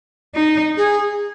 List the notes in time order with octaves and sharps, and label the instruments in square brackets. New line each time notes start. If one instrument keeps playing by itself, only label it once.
[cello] D#4
[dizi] G#4